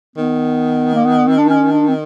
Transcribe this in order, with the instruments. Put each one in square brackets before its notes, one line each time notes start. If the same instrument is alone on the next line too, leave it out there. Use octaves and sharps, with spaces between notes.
[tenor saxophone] D#3 [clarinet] B3
[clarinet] A#3
B3
C4
D4
C#4
D4
C4